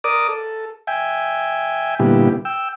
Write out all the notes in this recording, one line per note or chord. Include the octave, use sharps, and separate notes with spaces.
A#4 D5 D6 D#6
A4
E5 G5 G#5
A#2 D3 G3 B3 E4 G4
G5 E6